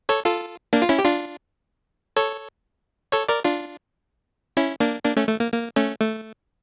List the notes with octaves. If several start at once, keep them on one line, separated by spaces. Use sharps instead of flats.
A4 C#5
F4 A4
A#3 D4
F4
C#4 E4
G4
D4 F4
A4 C#5
A4 C#5
A#4 D5
D4 F4
C#4 E4
A#3 D4
A#3 D4
A3 C#4
A3
A#3
A#3
A3 C#4
A3